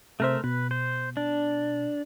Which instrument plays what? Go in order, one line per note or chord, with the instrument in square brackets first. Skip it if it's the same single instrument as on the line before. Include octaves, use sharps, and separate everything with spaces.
[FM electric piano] C3 C5 [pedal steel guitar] A3 A#4 E5
[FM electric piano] B2 [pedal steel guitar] B4
[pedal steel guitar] C5
D4